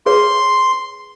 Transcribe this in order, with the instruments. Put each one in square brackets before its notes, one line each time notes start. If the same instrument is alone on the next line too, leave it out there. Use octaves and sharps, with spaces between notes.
[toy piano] G#4 B4 C#5 [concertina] C6